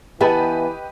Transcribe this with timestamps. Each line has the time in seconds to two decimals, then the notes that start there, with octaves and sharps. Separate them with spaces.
0.21 E3 B3 G4 B4 D#5 E5 A5 B5